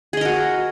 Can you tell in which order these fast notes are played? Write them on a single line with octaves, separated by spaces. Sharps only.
G#4 D#5 A#4 F#4